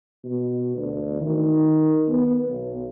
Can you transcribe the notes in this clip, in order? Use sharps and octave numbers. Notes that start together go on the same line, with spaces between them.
B2
D2
D#3
B3
B1